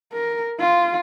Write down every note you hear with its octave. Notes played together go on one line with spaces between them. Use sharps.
A#4
F4